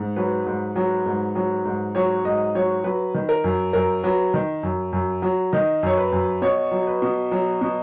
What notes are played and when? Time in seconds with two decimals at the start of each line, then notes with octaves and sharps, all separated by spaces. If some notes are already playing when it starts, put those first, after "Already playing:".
Already playing: G#2
0.16 F#3 B4
0.46 G#2
0.76 F#3
1.06 G#2
1.35 F#3
1.65 G#2
1.95 F#3 C#5
2.25 G#2 D#5
2.55 F#3 C#5
2.84 F#3 B4
3.14 D#3
3.29 A#4
3.44 F#2
3.73 F#2 A#4
4.04 F#3 B4
4.34 D#3
4.63 F#2
4.93 F#2
5.22 F#3
5.53 D#3 D#5
5.83 F#2 C#5
5.97 B4
6.12 F#2
6.42 B2 C#5
6.72 F#3
6.87 B4
7.02 B2
7.32 F#3
7.61 B2